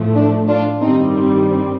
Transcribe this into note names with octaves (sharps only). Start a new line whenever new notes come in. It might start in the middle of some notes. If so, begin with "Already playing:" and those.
Already playing: A2 F3 A3
D4
D4 F4
G2 D#3 G3 C4 D#4
C4
C4